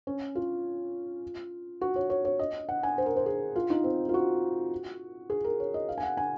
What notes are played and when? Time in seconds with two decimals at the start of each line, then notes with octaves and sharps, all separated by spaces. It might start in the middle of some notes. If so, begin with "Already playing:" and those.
0.07 C#4
0.35 F4
1.81 F#4
1.96 C#5
2.10 C#5
2.25 C#5
2.39 D#5
2.69 F#5
2.83 G#5
2.98 C5
3.06 A#4
3.16 C5
3.26 G#4
3.56 F4
3.70 D#4
3.84 C4
4.09 F4
4.14 F#4
5.30 G#4
5.44 A#4
5.60 C#5
5.74 D#5
5.89 F5
5.98 G#5
6.03 F#5
6.17 G#5